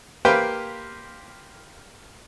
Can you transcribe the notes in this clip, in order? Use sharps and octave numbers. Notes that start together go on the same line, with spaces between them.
A#3 G4 B4 C5 F5 G5